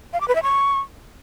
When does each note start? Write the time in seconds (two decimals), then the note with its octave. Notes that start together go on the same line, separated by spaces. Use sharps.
0.13 F5
0.21 D6
0.28 B4
0.35 E5
0.43 C#6